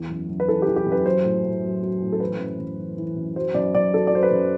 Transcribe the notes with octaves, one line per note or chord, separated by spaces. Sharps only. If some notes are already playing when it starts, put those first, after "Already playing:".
Already playing: E2 E3
F#2
F#2
B4
E3 A4
G4
E3
G4
F#2
B4
F#3 C5
A2
A2
F#3
F#3
A2
A4
E3 B4
F#2
F#2
E3
E3
F#2
F#3 C5
F#2 D5
F#2 D5
F#3 A4
D5
F#3 C5
B4
F#2